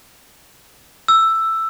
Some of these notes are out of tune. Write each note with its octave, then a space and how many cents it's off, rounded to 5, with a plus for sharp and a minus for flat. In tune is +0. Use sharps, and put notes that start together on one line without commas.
E6 +5